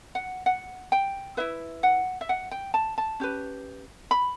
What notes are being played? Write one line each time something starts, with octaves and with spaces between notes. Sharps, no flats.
F#5
F#5
G5
E4 B4 E5
F#5
E5
F#5
G5
A5
A5
C#4 G4 B4
B5